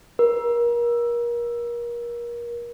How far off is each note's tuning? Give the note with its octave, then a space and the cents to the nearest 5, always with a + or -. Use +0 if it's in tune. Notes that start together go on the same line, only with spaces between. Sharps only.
A#4 +30